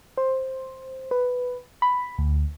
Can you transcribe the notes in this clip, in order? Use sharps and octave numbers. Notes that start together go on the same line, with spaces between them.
C5
B4
B5
D2